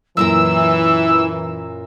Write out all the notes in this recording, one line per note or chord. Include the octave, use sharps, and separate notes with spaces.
F#2 A#2 E3 E4 A#4 E6